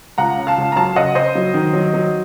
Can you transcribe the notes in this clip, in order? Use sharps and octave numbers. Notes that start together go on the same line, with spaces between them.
C#2 F#5 A#5
C#3
F5 A5
C#2
A#5
F#3 F5 A5
C#3 D#5 F#5
C#3 C5 D#5
F#3
D#3
F#3
F#3